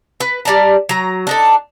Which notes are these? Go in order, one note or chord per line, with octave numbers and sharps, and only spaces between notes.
B4
G3 D5 A5 A#5
F#3 A#5
D4 D#4 A4